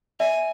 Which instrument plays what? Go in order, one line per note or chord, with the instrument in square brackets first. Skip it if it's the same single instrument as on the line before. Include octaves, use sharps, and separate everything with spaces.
[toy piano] D5 E5 [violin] G#5